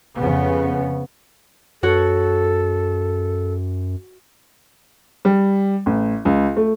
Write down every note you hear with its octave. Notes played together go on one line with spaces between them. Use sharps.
F2 C#3 B3
F#2 F#4 A4 C#5
G3
A1
C#2
A3